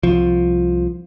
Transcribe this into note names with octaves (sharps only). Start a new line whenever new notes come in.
C2 F3